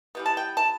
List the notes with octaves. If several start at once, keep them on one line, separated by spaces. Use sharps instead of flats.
E3 G3 B3
A5
G5
A5